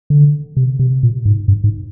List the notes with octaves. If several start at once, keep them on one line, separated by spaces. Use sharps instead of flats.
D3
C3
C3
A#2
G#2
G2
G#2